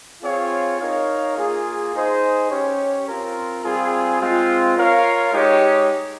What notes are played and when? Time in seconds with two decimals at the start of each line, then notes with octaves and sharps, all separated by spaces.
0.23 C4 F4 G#4 C#5 F5
0.80 D#4 A#4 C#5 F5
1.37 A#3 F4 G#4
1.93 D#4 G#4 C5 D#5
2.50 C#4 G4 C#5
3.06 C4 F4 A#4
3.64 G3 C4 F4 G#4
4.21 G#3 C4 F4
4.77 F4 A#4 C#5 F5
5.33 G#3 D#4 G4 C#5